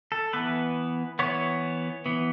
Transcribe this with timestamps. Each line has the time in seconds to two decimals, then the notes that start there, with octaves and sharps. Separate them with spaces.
0.12 A4
0.33 E3 B3 B4
1.19 E3 B3 C#5
2.06 E3 B3